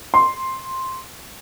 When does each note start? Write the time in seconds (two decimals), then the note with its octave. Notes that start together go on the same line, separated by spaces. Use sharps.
0.14 C6